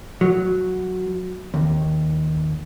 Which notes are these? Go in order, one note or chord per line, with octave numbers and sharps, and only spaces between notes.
F#3
D#2